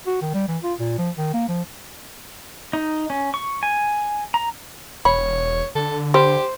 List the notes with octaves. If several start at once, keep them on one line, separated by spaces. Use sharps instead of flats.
F#4
D#3
G3
E3
F4
A#2
F3
D#3
A#3
F3
D#4
C#4
C#6
G#5
A#5
E1 C#5 B5
D3 A4
G3 G4 C5